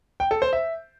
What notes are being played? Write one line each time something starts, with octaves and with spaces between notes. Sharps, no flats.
G5
A4
C5
E5